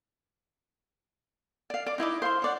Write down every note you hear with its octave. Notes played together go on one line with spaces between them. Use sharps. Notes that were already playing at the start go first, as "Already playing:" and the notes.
D5 F5
D5 D6
D#4 E4 D#5 D6
C5 F5 C6
C#5 D5 F#5